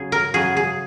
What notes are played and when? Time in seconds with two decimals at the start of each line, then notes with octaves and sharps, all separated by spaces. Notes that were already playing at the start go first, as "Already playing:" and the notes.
Already playing: C#3 F#3 C#4 G#4
0.12 A#4
0.34 C#3 F#3 G#4
0.57 G#4